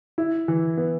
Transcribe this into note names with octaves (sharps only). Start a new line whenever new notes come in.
E4
E3
B3